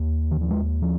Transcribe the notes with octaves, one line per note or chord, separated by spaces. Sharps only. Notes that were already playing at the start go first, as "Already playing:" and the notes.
Already playing: D#2
D#3
F3
G#3
F3